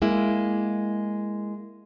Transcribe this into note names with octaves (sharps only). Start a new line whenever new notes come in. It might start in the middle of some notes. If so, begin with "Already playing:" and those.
G#3 A#3 E4